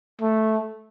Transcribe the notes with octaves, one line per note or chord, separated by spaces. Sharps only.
A3